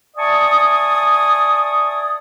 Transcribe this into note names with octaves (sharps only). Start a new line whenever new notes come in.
D5 E5 G#5 A5 C#6 D#6